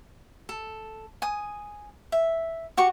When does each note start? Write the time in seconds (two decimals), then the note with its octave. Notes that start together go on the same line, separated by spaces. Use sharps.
0.49 A4
1.22 G#5 D#6
2.12 E5
2.77 F#4 G4 C#6